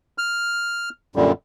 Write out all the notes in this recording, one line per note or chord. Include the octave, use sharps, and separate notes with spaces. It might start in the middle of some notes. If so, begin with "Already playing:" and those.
F6
F#2 A#2 D3 G3